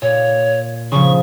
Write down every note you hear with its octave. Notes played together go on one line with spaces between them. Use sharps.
A#2 C#5
C#3 F3 C#6